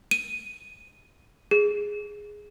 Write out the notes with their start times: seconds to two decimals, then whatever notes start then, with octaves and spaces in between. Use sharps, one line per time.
0.11 D#7
1.51 G#4